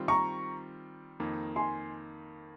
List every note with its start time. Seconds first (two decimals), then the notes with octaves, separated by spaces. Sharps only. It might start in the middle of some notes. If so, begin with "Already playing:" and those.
Already playing: D#3 G3 C4 F4
0.08 A#5 C#6
1.20 F2 D#3 A#3 D#4
1.56 G#5 C6